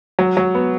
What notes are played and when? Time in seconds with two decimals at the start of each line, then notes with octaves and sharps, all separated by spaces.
0.19 F#3
0.37 F#3
0.55 B3